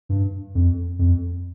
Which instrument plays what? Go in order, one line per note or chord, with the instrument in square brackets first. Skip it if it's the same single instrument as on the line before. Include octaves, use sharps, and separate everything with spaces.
[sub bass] G2
F2
F2